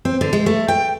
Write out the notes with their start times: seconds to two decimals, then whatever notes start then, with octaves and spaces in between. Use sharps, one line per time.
0.05 C4
0.21 D3
0.33 G#3
0.46 A3
0.68 G5